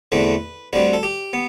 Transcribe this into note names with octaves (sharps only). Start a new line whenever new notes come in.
E2 D3 A3 C4 B4
D2 D3 G3 C4 B4
A4
G4
B3